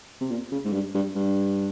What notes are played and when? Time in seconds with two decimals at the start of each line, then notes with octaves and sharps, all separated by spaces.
0.21 C3
0.30 A#2
0.52 C#3
0.65 G#2
0.73 G2
0.95 G2
1.16 G2